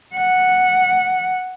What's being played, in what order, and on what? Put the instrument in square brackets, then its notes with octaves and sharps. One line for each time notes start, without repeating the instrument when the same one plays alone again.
[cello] F#5